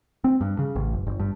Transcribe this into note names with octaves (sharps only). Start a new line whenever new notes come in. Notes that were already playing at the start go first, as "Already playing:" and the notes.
C4
G2
C#3
A1
F#1
G1
G2